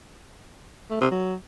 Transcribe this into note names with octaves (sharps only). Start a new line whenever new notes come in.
A3
C3
F#3